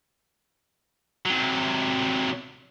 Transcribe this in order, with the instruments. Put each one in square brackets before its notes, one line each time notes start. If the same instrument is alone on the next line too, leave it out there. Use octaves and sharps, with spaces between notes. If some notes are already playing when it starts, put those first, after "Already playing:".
[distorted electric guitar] C3 F#3